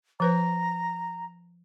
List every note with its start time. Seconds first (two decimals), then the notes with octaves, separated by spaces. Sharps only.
0.20 F3 B4 C5 A#5